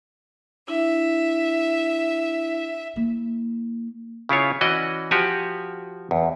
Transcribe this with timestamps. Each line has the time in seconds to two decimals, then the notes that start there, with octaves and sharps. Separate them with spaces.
0.68 D4 E4 E5
2.96 A#3 E4
4.29 C#3 E4 F4 C#5
4.61 E3 C#4 F#4 D5 D#5
5.11 F3 F#4 G4 G#5
6.11 E2